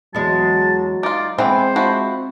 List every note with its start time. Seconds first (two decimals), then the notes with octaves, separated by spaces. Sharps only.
0.15 E2 F#3 G#3 A5
1.03 D#4 F4 D5
1.38 E3 G#3 B3 C4 C5
1.76 F3 E4 F#4